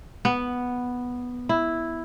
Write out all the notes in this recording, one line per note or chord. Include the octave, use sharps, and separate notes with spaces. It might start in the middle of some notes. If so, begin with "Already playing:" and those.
B3
E4